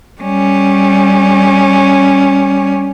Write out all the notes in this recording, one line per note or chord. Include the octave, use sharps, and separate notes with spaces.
G3 C#4